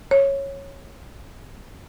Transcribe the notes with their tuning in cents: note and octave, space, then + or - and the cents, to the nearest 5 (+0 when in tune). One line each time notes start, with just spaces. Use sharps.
C#5 -10